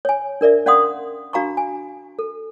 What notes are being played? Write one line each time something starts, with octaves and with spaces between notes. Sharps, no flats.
C#5 G#5
D4 A#4 D5 E5
C#4 D5 F5 F#5 C6 D#6
D4 F#4 F5 A#5 B5 C#6
G#5
A4